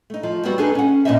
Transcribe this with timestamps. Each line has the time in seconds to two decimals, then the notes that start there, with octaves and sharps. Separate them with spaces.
0.10 A3 D#4
0.23 F3
0.44 F#3 G3 B3 C4 F#4
0.58 D4 D#4 G#4 A4 B4
0.75 C#4 F#5
1.05 A#2 D3 D#4 C#5 D#5 E5